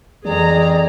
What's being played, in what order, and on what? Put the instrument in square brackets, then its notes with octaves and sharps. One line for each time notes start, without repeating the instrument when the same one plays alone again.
[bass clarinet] F2 [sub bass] E3 [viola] G#4 A#5 [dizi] D5